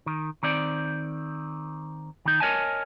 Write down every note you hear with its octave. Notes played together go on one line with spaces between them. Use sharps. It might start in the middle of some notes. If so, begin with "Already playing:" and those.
D#3
D#3 C4 D5
D#3 D#4
A#4 C#5 D#5 G#5 A5